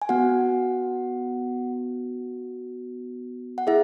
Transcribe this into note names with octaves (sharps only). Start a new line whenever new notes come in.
G#5
B3 F#4 F#5
F#5
E4 G#4 E5